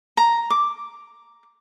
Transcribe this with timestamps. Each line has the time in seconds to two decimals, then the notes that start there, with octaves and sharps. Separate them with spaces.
0.17 A#5
0.50 D6